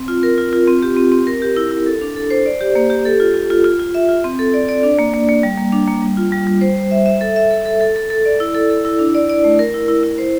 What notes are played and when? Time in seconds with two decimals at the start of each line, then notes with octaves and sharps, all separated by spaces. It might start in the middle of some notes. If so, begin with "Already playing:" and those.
Already playing: C4
0.08 F4
0.23 A#4
0.38 F4
0.53 F4
0.67 C4
0.83 G4
0.97 C4
1.12 C4
1.27 A#4
1.42 G4
1.56 E4
1.71 E4
1.86 A4
2.01 D4
2.16 A4
2.30 C5
2.46 D5
2.61 G4
2.75 A#3
2.90 G4
3.05 A4
3.20 F4
3.34 F4
3.50 F4
3.64 F4
3.79 F4
3.94 E5
4.09 F4
4.24 C4
4.39 A4
4.54 D5
4.69 D5
4.83 D4
4.99 A#3
5.13 A#3
5.29 A#3
5.43 G3
5.58 A#3
5.73 D4
5.88 A#3
6.02 G3
6.17 F4
6.32 G3
6.47 G3
6.61 C5
6.77 C5
6.91 E5
7.06 E5
7.21 A4
7.36 E5
7.51 A4
7.66 A4
7.81 A4
7.96 A4
8.10 A4
8.25 D5
8.40 E4
8.55 A4
8.70 A4
8.85 E4
8.99 D4
9.15 D5
9.30 D5
9.44 A3
9.59 A#4
9.74 E4
9.88 E4
10.03 E4
10.18 C5